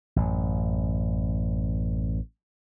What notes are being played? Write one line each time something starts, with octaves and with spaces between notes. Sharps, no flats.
A1 F#2